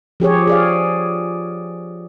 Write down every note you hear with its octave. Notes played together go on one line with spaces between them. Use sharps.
F3 G4 G#4 C#5
G#4 D5 F5